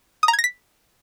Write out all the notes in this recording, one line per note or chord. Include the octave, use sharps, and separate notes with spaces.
D#6
A#5
G#6
A#6
B6